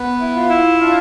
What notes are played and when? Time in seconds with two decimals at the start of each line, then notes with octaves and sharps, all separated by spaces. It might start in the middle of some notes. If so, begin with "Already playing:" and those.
Already playing: B3
0.20 E4
0.35 F4
0.49 E4
0.79 D4 F4